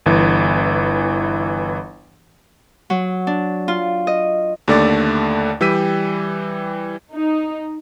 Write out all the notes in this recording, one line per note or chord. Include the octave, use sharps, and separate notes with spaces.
G1 E3
F#3
D4
F4
D#5
D#2 D3 A3 D5 D6 A6
E3 G3 G5 E6 B6 D#7
D#4